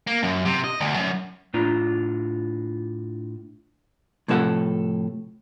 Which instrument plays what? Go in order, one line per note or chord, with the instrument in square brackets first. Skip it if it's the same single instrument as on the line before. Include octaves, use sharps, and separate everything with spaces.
[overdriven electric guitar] A#3
F#2
C3
D#5
D2
F#2
[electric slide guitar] A2 D4 F4 A#5
[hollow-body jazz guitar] A2 C3 F3 A4 C#5 F#5